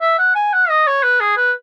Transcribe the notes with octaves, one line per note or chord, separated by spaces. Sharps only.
E5
F#5
G#5
F#5
D#5
C#5
B4
G#4
B4